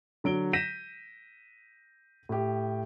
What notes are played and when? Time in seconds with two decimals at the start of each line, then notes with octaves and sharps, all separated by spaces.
0.24 D3 F#3 D7 G7
0.53 G6 A#6 B6 D#7 E7
2.29 A2 G4